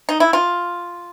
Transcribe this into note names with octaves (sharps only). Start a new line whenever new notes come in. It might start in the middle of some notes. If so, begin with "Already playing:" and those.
D#4
E4
F4